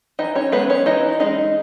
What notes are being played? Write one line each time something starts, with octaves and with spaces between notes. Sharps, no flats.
E3 D#4 D#5
C#4 C#5
G#3 B3 C#4 B4
C#4 C#5
E3 D#4 D#5
G#3 C#4 D#4 D#5